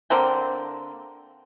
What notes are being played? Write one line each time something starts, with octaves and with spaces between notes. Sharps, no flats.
D3 A#3 C4 G5